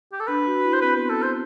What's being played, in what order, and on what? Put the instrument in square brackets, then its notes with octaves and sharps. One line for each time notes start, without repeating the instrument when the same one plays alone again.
[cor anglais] G4
A4
[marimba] D4 [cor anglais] B4
[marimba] F#4
E4
[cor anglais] C5
[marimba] C4 [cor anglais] B4
[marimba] B3 [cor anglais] B4
[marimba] B3 [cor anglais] A4
[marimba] C4 [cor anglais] C5